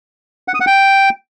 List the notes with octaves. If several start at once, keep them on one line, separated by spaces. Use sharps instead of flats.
F#5
D#6
F#5
G5